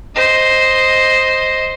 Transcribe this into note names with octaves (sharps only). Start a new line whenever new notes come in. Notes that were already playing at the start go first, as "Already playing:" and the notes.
C5 D#5